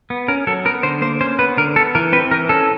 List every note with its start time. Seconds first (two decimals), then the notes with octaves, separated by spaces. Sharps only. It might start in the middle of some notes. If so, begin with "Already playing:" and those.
0.10 B3
0.28 C#4 A#4
0.47 F#3 A4
0.65 B3 A#4
0.83 D3 C5
1.02 A#3 C5
1.21 C#4 C5
1.39 B3 B4
1.57 D3 A#4
1.76 B3 A4
1.95 E3 A#4
2.13 C4 B4
2.31 E3 A#4
2.49 C#4 A4